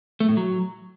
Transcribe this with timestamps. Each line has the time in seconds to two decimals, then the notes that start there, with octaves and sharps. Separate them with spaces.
0.20 A3
0.29 A2
0.37 F#3